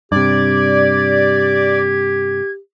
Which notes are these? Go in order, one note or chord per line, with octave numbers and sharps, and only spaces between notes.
G2 C3 G4 D5 G#6